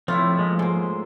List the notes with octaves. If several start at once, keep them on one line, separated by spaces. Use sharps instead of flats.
A2 F3 C4 E4 F4 C#5 E5
G#3 A#3
G#2 A#3 C6